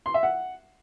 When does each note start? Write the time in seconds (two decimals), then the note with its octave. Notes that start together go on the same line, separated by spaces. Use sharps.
0.06 C6
0.14 E5
0.23 F#5